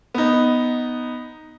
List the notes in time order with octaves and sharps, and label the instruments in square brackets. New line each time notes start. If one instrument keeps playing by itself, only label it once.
[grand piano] B3 D#4